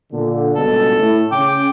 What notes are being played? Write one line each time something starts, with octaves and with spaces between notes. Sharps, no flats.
A#2 D3
G1 C#2 B2 A4
A2
C#3 C#4 G5 D6